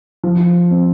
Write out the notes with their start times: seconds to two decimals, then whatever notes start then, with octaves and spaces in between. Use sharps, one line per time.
0.24 F3
0.71 C4